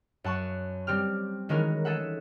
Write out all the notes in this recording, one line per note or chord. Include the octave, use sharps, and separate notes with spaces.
F#2 F#5 A5 C#6
G3 C4 G4 F6
D#3 E3 G#3 C#4 F#4 A#4
G#4 A4 E5 F#5